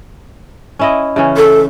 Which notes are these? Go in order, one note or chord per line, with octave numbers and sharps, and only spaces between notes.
C#4 E4 D#5
C#3 E3 C#4
A4